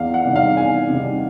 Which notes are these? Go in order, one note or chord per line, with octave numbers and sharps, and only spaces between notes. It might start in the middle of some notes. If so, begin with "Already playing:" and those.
Already playing: E2 F5
F#5
C3 D#3 G3
F5
E2 G#5
C3 D#3 G3